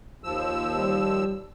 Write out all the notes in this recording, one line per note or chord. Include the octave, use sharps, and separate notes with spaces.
D#2 F3 E6
G3